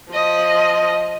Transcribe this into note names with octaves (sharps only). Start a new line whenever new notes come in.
F3 D#5